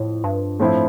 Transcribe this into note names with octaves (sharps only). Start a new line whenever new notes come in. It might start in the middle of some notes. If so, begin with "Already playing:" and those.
Already playing: F2 A2
G2
A2 F3 C4 E4